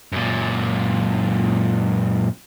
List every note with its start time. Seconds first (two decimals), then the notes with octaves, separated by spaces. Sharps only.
0.12 F#2 A#2